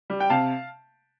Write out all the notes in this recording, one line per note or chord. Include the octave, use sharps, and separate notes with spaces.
G3
G5
C3 F5 A5